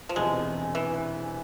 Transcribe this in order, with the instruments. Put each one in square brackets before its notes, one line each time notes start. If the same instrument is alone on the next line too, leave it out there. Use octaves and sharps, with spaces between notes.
[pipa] F3
[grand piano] E1 E2 C3 [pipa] G#3
[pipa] E3